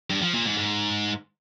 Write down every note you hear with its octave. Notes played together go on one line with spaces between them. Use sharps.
G2
F3
A#2
G#2
G#2